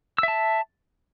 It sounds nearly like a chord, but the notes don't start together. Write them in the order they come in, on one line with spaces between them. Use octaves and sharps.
E6 E5 A5